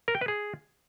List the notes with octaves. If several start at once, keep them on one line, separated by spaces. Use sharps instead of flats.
A#4
G5
B4
G#4